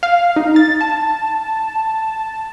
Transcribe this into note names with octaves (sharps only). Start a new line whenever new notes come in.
F5
D#4
A6
A5